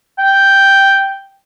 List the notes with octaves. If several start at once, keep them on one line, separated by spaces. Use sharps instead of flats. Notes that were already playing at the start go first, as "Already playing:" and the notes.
G5